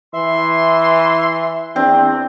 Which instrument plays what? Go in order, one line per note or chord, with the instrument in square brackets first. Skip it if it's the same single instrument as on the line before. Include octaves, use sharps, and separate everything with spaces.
[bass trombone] E3 [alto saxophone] E5 [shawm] C6
[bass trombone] E2 [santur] C4 [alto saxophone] D4